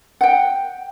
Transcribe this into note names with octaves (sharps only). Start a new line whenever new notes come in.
F#5 G5